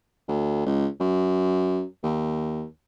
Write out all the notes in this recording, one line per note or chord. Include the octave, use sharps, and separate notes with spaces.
D2
C#2
F#2
D#2